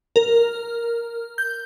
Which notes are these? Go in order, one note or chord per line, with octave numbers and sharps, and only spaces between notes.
A#4
G6